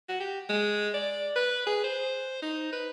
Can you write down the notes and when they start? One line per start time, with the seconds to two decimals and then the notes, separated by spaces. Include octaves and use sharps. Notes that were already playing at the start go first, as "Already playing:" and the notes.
0.09 F#4
0.20 G4
0.49 G#3
0.94 D5
1.36 B4
1.66 G#4
1.84 C5
2.42 D#4
2.72 B4